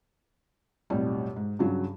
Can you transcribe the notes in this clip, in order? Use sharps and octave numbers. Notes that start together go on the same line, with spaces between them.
B1 F2 A2 G3
G#2
G2 C#3 F#3